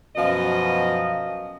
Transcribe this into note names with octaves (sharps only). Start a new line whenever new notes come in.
F#2 B2 F3 D#5